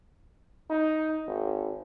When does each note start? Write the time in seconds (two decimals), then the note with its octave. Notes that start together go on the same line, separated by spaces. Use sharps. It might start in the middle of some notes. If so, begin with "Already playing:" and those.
0.70 D#4
1.27 G#1